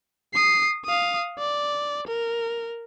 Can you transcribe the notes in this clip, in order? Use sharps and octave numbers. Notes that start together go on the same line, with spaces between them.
D#6 C7
F5 D#6
D5
A#4